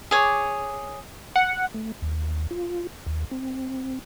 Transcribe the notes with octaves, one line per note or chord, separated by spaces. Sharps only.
G#4 C#5 D6
F#5
A3
D#2
F4
D#2
C4